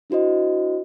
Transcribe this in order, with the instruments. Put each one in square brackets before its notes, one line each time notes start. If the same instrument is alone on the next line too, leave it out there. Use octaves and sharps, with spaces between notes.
[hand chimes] D4 E4 F#4 C5 D#5